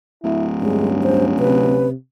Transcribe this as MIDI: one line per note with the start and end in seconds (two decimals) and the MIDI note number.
0.24 1.92 26
0.24 0.47 64
0.61 1.33 43
0.61 0.88 56
0.61 1.87 61
1.03 1.25 72
1.39 1.93 48
1.39 1.88 71